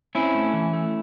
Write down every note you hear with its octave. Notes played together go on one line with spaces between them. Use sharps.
C4 C#4 E4
A3
E3
A3